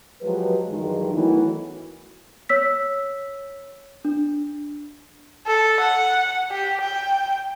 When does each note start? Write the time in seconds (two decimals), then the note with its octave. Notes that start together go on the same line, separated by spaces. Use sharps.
0.22 F3 F#3 G#3 G4 B4
0.68 G2 D#3 E3 F#3 G#3
1.12 D#3 E3 F#3 A3 B3 D#4
2.49 C#5 E6 B6
4.05 D4
5.47 A4
5.80 F#5
6.51 G4
6.81 G5